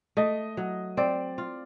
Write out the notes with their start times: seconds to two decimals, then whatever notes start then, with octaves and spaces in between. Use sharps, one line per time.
0.17 A3 D#5
0.57 F#3
0.97 C4 D5
1.38 F4